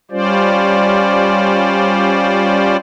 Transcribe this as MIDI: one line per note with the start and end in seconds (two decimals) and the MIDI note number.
0.11 2.77 55
0.11 2.77 61
0.11 2.77 65
0.11 2.77 72
0.11 2.77 74